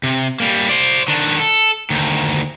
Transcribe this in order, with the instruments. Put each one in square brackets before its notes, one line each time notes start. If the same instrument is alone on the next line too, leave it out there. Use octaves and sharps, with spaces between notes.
[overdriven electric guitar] C3
G3 A#3
C5 D5
D#3 D4
A4
D2 D#3